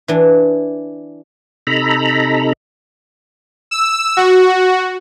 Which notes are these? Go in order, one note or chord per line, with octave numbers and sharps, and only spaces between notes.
E3 D4
C3 D#4 A4 A#5 B5
E6
F#4